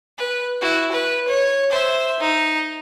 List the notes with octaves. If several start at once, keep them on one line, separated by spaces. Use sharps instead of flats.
B4
E4 F#4
B4
C#5
C5 E5
D#4